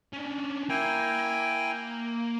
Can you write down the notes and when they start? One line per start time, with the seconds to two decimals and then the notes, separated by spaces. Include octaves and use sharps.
0.13 C#4 D4
0.70 A#3 E4 G5 G#5